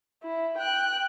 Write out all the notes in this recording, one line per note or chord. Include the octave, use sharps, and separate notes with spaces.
E4
G5 F#6